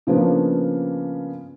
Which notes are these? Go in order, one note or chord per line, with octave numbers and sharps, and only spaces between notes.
C#3 F3 A#3 B3 D4